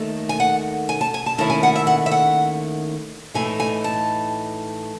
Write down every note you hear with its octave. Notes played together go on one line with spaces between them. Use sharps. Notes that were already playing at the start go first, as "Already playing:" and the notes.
Already playing: D#2 D#3 A3
G#5
F#5
G#5
A5
G#5
A5
D#2 D#3 A3 C#4 E4 A5
G#5
F#5
E5
F#5
E5
F#5
A2 E3 A3 D#4 G#5
G#5
A5